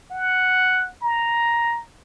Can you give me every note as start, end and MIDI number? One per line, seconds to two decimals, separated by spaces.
0.11 0.88 78
1.02 1.81 82